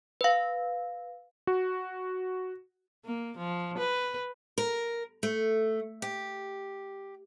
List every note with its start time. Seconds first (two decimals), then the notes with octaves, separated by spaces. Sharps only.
0.21 B4 F5
1.47 F#4
3.05 A#3
3.38 F3
3.78 B4
4.58 A#4
5.23 A3
6.02 G4